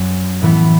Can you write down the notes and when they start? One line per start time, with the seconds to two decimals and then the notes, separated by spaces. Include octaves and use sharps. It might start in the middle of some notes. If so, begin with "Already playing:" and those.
Already playing: F#2 F#3
0.41 A2 E3 B3